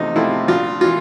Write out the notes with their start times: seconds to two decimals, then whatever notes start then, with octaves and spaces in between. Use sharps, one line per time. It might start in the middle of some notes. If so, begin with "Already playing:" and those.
Already playing: E2 C3 F3 A3 D#4
0.16 C3 F3 A3 E4
0.48 A#1 F4
0.81 E3 F4